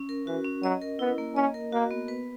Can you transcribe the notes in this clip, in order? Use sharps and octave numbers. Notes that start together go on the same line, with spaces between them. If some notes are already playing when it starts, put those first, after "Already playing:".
Already playing: C#4
A#4
E3 F#4
C#4
F#3 D#5
A#4
B3 E4
A#3
C#4 D#5
A#4
A#3 F#4
B3
B4